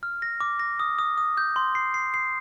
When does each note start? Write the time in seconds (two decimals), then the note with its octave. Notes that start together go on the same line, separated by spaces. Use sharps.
0.03 F6
0.22 A#6
0.40 D6
0.59 A#6
0.80 D#6
0.99 D#6
1.18 D#6
1.37 G6
1.56 C6
1.75 C7
1.94 C7
2.14 C7